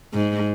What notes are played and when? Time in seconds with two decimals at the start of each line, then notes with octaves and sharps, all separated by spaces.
0.13 G#2